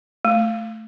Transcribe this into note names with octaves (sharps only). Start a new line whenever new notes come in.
A3